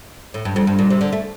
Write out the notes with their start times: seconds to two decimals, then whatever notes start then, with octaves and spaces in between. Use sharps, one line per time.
0.34 A2
0.45 G2
0.56 F2
0.67 G2
0.79 A#2
0.90 C3
1.01 D3
1.12 A3